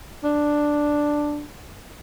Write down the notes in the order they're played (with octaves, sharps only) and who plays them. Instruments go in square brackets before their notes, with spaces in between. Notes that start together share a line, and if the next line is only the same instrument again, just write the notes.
[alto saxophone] D4